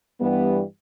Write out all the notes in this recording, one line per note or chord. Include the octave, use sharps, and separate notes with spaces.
G2 E3 G3 B3